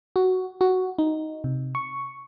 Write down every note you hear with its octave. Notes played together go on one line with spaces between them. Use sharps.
F#4
F#4
D#4
C3
C#6